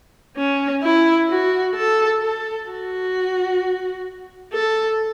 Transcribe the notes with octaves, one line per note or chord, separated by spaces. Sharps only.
C#4
E4
F#4
A4
A4
F#4
A4